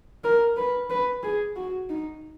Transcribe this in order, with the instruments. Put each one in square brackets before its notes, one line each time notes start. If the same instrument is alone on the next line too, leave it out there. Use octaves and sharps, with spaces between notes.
[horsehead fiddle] A#4
B4
B4
G#4
F#4
D#4